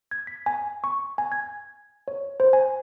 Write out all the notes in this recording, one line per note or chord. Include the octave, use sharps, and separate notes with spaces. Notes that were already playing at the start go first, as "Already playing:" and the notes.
G#6
B6
G#5
C#6
G#5
G#6
C#5
C5
G#5